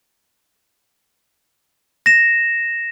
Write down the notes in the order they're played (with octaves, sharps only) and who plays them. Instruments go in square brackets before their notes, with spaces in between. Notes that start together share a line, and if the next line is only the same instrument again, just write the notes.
[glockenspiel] A#6 E7